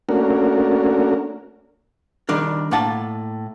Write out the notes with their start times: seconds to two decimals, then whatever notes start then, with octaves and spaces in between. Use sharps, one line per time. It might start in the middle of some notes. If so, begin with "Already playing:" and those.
0.09 A3 A#3 C#4 D4 F#4 A#4
2.29 D#3 G3 D4 A#4
2.71 A2 A#3 F#5 A5